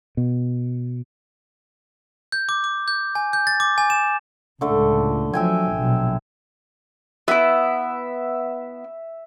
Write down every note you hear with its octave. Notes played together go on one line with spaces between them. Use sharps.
B2
G6
D6
D6
G6
G#5
G6
A6
D6
G#5
E7
C#2 A2 D3 A3
F3 F#3 E5 G5 G#5
A#1 B2 F#3
B3 E4 E5